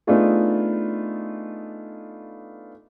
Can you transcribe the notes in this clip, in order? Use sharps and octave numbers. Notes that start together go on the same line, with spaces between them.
A3 B3 D4 D#4 F4 G#4